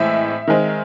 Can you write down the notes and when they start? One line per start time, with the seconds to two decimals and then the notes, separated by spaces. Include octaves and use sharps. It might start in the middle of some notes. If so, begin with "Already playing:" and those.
Already playing: A2 E3 G#3 C4 E5
0.47 D#3 G#3 C4